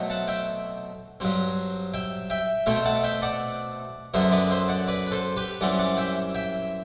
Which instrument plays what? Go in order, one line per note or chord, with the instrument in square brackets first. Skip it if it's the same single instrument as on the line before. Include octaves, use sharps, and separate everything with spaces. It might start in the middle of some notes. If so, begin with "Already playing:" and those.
Already playing: [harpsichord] B2 F#3 A3 C4
F#5 A5
E5 G5
G2 F#3 C4
E5 G5
E5 G5
B2 A3 C4 E5 G5
F#5 A5
E5 G5
D5 F#5
F#2 D3 F#3 B3 C5 E5
B4 D5
C5 E5
D5 F#5
B4 D5
B4
A4 C5
G4 B4
F#2 E3 G3 C4 D5 F#5
D5 F#5
E5 G5
E5 G5